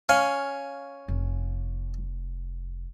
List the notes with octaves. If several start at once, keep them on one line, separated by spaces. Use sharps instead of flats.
C#4 F5 G#5
F1